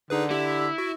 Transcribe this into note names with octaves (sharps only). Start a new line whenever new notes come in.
D3 D#4 G#4 B4
E4 G4
F#4